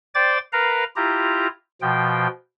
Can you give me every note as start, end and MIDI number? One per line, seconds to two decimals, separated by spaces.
0.15 0.38 72
0.15 0.38 74
0.15 0.38 79
0.15 0.38 86
0.15 0.38 93
0.53 0.84 70
0.53 0.84 71
0.53 0.84 77
0.53 0.84 82
0.96 1.47 64
0.96 1.47 65
0.96 1.47 67
0.96 1.47 82
1.81 2.27 47
1.81 2.27 53
1.81 2.27 79